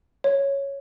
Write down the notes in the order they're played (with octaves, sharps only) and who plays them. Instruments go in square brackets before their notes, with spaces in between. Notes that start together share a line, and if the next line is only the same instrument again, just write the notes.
[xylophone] C#5